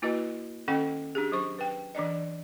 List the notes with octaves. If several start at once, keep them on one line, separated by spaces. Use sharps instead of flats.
A#3 E4 F#4 B4 D#5
D#3 C#4 A4 D#5 F#5 G5
D4 G4 G#4
F#3 C5 C#6
B4 G5
E3 D4 D5 D#5